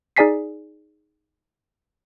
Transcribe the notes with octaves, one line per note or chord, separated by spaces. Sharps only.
D#4 G#4 D5 G#5 B6 C7